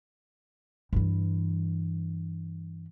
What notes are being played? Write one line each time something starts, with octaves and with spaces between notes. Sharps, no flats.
G2 E3